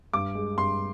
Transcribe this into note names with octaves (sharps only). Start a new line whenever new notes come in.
G2 D6
G#3
G2 C6